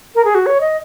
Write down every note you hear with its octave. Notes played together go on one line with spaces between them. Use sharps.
A#4
G#4
F#4
C#5
D#5